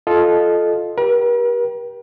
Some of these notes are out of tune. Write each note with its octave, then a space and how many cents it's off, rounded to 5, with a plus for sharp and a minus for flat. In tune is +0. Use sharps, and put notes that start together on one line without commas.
F4 +0 A4 -15 D#5 -10
G4 -10 A#4 +45